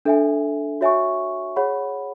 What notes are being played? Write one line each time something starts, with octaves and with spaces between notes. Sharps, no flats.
D4 A4 E5 G#5
F#4 C#5 E5 G#5 C#6
G#4 C#5 F#5 B5